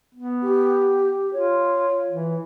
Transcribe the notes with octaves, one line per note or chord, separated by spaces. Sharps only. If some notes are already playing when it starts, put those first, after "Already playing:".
B3
G4
F4 C#5
E3